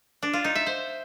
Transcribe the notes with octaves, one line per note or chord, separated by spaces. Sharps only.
D4
F4
D#4
E5
C5